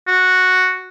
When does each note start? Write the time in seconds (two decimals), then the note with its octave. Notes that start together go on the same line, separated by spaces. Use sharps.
0.08 F#4